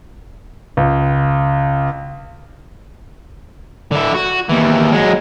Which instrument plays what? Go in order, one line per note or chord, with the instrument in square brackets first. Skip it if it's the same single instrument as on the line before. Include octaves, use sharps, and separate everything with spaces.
[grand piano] C#2
[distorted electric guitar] D3 E4
F#4
D#2 E3
F#3 G#3